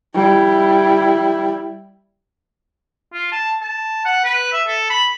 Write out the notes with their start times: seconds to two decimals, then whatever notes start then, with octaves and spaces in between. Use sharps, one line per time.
0.14 G3 E4
3.13 F4
3.32 A5
3.61 A5
4.05 F#5
4.25 B4
4.52 E5
4.68 A4
4.90 B5